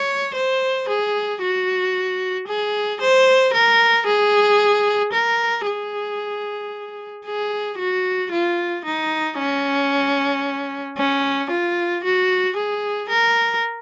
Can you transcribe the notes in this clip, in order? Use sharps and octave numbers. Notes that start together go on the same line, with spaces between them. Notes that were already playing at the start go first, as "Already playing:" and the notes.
Already playing: C#5
C5
G#4
F#4
G#4
C5
A#4
G#4
A#4
G#4
G#4
F#4
F4
D#4
C#4
C#4
F4
F#4
G#4
A#4